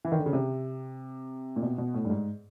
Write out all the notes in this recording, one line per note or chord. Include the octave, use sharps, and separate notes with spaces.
E3
D#3
D3
C#3
C3
A#2
B2
B2
A2
G2
G#2